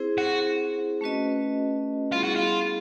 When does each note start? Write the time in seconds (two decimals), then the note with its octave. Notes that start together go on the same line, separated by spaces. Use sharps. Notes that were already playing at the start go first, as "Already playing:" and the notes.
Already playing: C4 E4 G#4 C5
0.18 F#4
1.01 A3 C#4 F#4 B4 D#5
2.12 G3 B3 E4 F4 G#4
2.23 F#4
2.35 F4